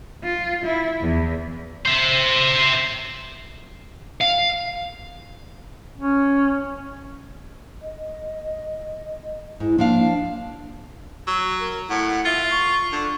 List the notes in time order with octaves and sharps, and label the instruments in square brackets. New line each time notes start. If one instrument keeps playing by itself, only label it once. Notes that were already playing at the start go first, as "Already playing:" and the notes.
[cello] F4
E4
E2
[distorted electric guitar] C5 E5
[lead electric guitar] F5
[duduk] C#4
[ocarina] D#5
[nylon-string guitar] G#2 [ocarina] E4
[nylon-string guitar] F3 D4 F5 [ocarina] A#3
[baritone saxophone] F#3
[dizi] A#4
[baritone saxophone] A2 [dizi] F#5
[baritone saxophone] F4 [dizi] E5
[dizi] C#6
[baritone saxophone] D3